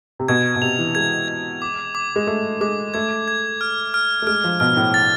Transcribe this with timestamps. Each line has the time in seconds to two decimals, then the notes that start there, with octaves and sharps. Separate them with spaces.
0.19 C3
0.28 B2 G#6
0.56 B2
0.62 C3 F7
0.79 E3
0.95 G#3 G#6
1.28 G#6
1.62 D6
1.95 D6
2.16 G#3
2.27 A3 D6
2.61 G#3 D6
2.94 A3 G#6
3.28 G#6
3.61 F6
3.94 F6
4.22 A3
4.27 G#3 F6
4.44 F3
4.60 B2 F6
4.77 A2
4.94 A6